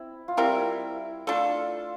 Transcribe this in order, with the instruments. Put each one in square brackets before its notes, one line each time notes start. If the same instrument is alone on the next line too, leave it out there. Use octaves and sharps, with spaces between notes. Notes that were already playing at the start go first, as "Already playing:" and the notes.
Already playing: [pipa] C4 [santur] E4
[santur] F4
[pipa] G3 C4 G4 A#4 [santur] E4
[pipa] A3 D4 A4 [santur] F4